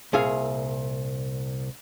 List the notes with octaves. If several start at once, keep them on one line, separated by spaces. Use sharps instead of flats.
C2 A#2 G#4 E5 F5